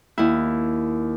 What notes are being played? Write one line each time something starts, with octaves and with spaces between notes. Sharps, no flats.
D#2 E4